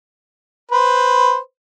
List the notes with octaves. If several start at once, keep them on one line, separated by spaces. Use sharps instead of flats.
B4 C5